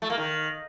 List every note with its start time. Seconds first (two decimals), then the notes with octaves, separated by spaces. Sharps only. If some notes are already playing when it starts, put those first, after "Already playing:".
0.02 A3
0.10 A#3
0.18 D#3